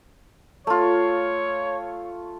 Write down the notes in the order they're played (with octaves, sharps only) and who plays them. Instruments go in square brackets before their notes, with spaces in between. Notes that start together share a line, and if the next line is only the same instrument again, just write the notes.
[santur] A3 F4 [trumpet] C#5